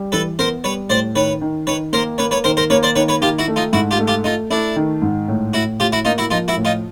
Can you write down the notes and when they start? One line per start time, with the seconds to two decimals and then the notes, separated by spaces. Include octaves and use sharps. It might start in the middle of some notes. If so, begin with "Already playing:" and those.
Already playing: G3
0.12 E3 A4 B4
0.39 B3 A#4 C5
0.64 G3 B4 C#5
0.90 A2 C5 D5
1.15 D#3 B4 C#5
1.41 D#3
1.67 D#3 B4 C#5
1.93 A#3 A#4 C5
2.18 A#3 B4 C#5
2.31 B4 C#5
2.44 D#3 A#4 C5
2.57 A#4 C5
2.70 A#3 B4 C#5
2.83 C5 D5
2.96 D#3 B4 C#5
3.08 B4 C#5
3.21 D#3 F4 G4
3.39 E4 F#4
3.48 A3
3.56 D#4 F4
3.73 G#2 E4 F#4
3.91 F4 G4
3.99 A3
4.08 F4 G4
4.24 A3 D#4 F4
4.50 A3 D4 E4
4.76 D#3
5.02 G#2
5.28 A2
5.53 A2 E4 F#4
5.80 A2 F4 G4
5.92 E4 F#4
6.05 A#3 D#4 F4
6.18 E4 F#4
6.31 F3 D#4 F4
6.48 E4 F#4
6.57 A2
6.65 D#4 F4